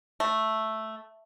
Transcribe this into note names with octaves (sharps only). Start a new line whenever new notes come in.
A3